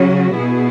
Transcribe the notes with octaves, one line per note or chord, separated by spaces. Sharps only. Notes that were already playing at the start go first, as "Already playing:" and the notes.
Already playing: C#3 F#3 C#4 F#4
B2 B3 E4 G#4